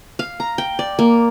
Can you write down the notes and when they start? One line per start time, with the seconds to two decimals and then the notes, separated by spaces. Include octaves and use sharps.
0.19 F5
0.40 A#5
0.58 G5
0.79 D5
0.99 A#3